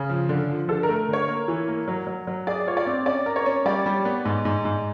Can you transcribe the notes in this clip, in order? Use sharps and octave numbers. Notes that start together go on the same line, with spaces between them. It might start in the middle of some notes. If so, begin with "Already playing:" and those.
Already playing: C#3
F3
D3
F3
D3 A4
A#4
A3
D3 C#5
A#3
E3
A#3
F#3
F#3
F#3
G#4 D5
F4 C#5
D5
C4
C#4 D5
A#4
C#5
C#4
G3 D5
G3
B3
G#2
G#2
G#2